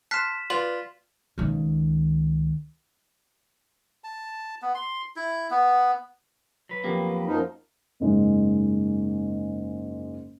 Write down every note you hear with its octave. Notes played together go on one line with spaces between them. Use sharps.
A5 C6 F6 F#6 B6 C7 E7
F4 B4 D5 F#7
C#2 D#3
A5
B3
C6
E4
B3
F#3 B4
F2 A#3 B3 G4
F#2 F3 D#4
F#1 G#2 G#3